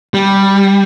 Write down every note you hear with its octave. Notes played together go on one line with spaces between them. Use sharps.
G3